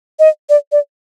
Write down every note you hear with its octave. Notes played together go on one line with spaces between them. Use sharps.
D#5
D5
D5